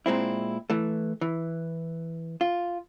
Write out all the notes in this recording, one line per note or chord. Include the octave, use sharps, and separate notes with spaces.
A#2 G#3 C4 E4
E3 A3
E3
F4